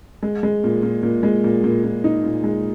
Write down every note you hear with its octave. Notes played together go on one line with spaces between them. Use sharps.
G#3
G#3
A#2
A#2
A#2
G#3
A#2
A#2
A#2
D#4
A#2
G#3